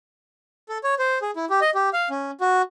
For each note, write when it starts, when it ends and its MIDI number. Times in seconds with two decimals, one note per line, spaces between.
0.69 0.78 69
0.84 0.95 73
0.99 1.18 72
1.22 1.31 68
1.36 1.45 64
1.50 1.60 67
1.61 1.70 75
1.75 1.89 67
1.93 2.09 77
2.10 2.31 61
2.41 2.62 66